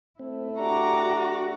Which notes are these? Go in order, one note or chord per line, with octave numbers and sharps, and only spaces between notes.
A3 C4 E4
D4 F#4 G4 A#5 D6